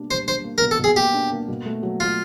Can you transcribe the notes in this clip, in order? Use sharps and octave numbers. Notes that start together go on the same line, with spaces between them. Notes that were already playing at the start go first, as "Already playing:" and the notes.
Already playing: B2 G3 A#3 D4
G3 C5
D4 C5
A#3
A#4
B2
A4
B2 G#4
A#3 G4
D4
A#3
B2
A3
F#3
F#3 F4